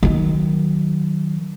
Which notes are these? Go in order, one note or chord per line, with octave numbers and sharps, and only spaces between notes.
D#3 F#3